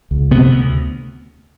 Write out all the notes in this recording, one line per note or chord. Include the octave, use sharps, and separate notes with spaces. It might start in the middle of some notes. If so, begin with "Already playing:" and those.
C#2
C3 B3
D2